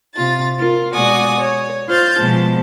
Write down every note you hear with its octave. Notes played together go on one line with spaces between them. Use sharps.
C3 F4 A6
F4 A#4
B2 G#3 F#4 D5 G#5 D#6
C#5
F4 C5 F6 G6 A6
B2 F3 G#3 A5